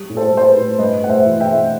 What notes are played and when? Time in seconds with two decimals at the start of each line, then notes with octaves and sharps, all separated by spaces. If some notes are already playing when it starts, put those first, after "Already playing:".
Already playing: G3
0.09 A2
0.17 A4 C5
0.32 G3 C5
0.48 B4
0.56 A2
0.78 G2 B4 D#5
1.01 A3 F#5
1.09 C5 E5
1.25 E3
1.40 E5 G5
1.48 A3